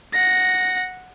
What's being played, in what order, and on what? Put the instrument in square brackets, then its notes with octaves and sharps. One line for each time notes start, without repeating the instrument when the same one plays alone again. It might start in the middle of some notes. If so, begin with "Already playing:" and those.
[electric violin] F#5 A#6